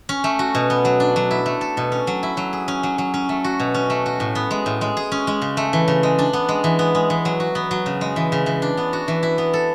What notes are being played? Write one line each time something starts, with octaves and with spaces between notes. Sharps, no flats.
C#4
A3
F#4
B2
B3
F#3
D4
F#3
E4
A3
A4
B2
C#4
F#3
E4
F#3
G#4
C#4
F#3
F#3
C#4
A3
F#4
B2
C#4
A3
F#4
A2
B3
G#3
A2
G#3
G#4
C#4
G#3
C#3
A3
E3
C#3
G#3
D4
B3
G#3
E3
B3
G#3
E3
F#3
F#4
B3
F#3
C#3
G#3
E3
C#3
E3
D4
B3
F#4
E3
E4
B3
A4